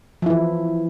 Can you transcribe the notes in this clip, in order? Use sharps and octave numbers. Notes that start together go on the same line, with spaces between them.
E3 F3 E4